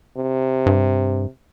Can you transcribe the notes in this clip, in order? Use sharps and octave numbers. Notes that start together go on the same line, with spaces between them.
C3
G2